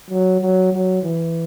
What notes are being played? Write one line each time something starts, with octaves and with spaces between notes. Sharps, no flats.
F#3
F#3
F#3
E3